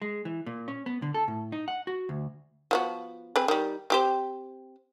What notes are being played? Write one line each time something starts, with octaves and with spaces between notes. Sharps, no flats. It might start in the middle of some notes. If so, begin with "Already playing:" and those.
G#3
E3
A#2
C#4
B3
D3
A4
A2
D#4
F#5
F#4
D2
F3 B3 F#4
C4 G#4 B4
D#3 G3
C4 G4 C5